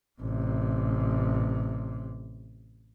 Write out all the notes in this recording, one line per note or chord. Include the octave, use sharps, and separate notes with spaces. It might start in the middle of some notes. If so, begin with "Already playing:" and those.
A1 C3